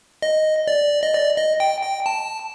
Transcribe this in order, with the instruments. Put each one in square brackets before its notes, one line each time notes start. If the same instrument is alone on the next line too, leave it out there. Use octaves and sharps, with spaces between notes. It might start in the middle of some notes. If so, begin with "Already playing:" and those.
[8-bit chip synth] D#5
D5
D#5
D5
D#5
G5
G5
A5